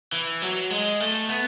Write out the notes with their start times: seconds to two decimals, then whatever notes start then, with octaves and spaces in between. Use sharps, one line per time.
0.12 E3
0.42 F#3
0.70 G#3
1.00 A3
1.29 B3